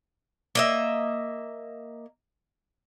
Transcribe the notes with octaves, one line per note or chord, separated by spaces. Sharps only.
A#3 D#5 E5